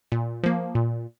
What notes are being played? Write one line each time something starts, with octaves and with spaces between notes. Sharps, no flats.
A#2
F3 A#3
A#2